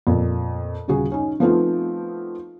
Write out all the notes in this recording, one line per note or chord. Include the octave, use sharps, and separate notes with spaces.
F2 A#2
D#1 C#3 F#4 G#4
C#4 D#4
F3 A3 B3 C4 D#4 F4